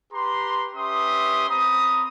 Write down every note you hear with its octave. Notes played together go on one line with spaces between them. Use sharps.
G4 B4 A#5 C6
C#4 G4 B4 E5 C6 D#6
C4 A#5 B5 D#6